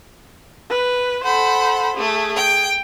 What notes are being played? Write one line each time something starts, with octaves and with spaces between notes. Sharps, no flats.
B4
A4 C5 F#5 B5
A3 G#4
G5